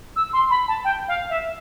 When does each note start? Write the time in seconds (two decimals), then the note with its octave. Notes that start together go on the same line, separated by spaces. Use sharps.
0.16 E6
0.33 C6
0.50 B5
0.68 A5
0.84 G5
1.08 F5
1.30 E5